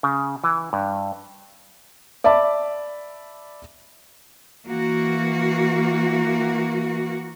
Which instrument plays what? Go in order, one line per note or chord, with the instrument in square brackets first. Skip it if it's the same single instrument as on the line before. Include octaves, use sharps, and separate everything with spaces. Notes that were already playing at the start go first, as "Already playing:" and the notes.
[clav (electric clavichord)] C#3
E3
G2
[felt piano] D5 E5 A5 B5 D6
[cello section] E3 A#3 F#4